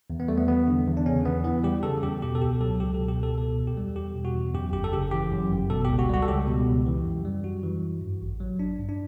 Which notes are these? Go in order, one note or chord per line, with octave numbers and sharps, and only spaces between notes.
E2
B3
G3 A3
B3
E2 B3
D3
E2
D4
C#3 C#4
E2 B3
E3 B3
G3 G4
C#3 A4
E2 G4
B2 G4
A4
C#2 G4
F#3 A4
C#2 G4
B2 A4
G4
C#2 A4
B2 A4
E2
G4
G3
E2 G4
B2
F#4
E2
F#2 G4
G1 G4
A4
C#3 G4
E3 G4
F#2
G1
B2 A4
C#2 G4
F#4
G3 F#4
A4
C#2 G4
B2
C#2
E3
F#2
G3
F#2 F#4
E3
F#2
G2
A1
F#3
A1 D4
G2
D4